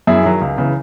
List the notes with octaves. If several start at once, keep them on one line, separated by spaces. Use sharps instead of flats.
F#2 E4 G#4
D#3 F#3
C#2
C#3 E3